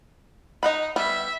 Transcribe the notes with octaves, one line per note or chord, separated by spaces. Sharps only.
D#4 D#5 F#5 B5
G3 B3 E5